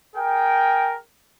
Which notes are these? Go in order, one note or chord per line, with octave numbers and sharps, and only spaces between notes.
G#4 A#4 G5